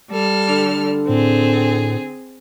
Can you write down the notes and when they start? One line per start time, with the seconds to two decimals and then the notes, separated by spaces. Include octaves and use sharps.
0.10 G3 A4 F6
0.49 D3
1.09 A2 C4 G#4